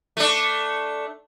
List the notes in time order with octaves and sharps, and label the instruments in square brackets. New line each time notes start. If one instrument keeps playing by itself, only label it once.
[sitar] A3 D4